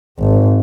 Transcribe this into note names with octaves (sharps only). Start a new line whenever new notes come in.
G#1